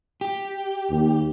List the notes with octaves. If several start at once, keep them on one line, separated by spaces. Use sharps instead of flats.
G4
D#2